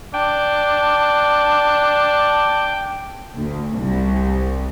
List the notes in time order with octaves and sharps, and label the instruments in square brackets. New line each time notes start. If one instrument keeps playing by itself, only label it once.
[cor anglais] D4 [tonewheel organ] G5
[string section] D2
C2